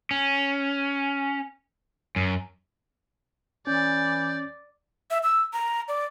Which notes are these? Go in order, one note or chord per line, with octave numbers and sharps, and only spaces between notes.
C#4
F#2
E3 C#4 D5 G6
E5
E6
A#5
D5